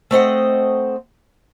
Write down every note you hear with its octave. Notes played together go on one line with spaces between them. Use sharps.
A3 C4 D#5 F#5